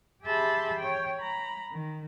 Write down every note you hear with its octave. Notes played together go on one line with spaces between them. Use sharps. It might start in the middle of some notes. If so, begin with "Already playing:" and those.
G4 G#4 E5 A5 B5 C6
C#5 G5
A#5 B5
D#3